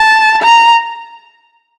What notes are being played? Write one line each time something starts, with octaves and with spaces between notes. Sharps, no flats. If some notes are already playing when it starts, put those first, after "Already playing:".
Already playing: A5
A#5